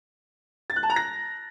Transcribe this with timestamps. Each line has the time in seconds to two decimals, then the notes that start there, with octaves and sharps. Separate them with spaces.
0.70 A6
0.76 F#6
0.83 A5
0.90 A#5
0.96 A#6